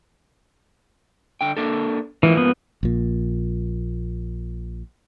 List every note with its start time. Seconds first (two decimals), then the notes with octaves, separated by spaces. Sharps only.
1.41 D3 G5
1.57 A#3 D4 A4
2.23 G#2 E3 F3 A#3
2.37 B3
2.83 A#1 A#2